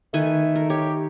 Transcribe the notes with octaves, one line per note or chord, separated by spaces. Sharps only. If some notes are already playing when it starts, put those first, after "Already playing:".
D#3 A3 B4 G#5
A#4
G4 C#5